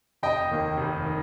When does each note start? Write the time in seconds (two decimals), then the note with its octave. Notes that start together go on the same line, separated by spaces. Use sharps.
0.23 F1 D#5 G5
0.51 D#2 D#3 A#3
0.77 F1
1.06 D#3